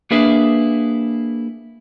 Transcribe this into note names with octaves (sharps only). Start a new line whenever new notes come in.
A#3 D4 E4 G#4 B4 E5